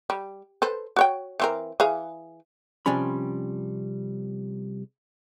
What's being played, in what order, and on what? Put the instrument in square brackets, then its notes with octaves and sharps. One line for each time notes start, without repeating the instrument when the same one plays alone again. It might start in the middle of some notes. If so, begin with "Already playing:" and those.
[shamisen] G3
A4 B4 C5
F#4 C#5 G5
E3 C4 A#4
E3 G#4 F5
[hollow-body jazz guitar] C3 F3 G3 C#4 B5